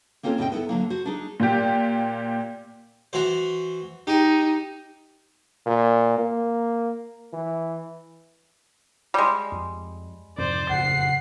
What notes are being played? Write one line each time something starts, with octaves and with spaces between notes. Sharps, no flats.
A#3 C4 C#4 F4 A4
D2 B2 C4 C#4 D#5 G5
B3 E4 A4
D3 F#3 A#3
F#4 C5
D4 D#4 G#4
A#2 G4
E3 F#4 C5
D#4 G4
A#2
A#3
E3
G3 G#3
F2
F2 G#2 C3 C5 D5
F#1 F2 A2 F#5 C7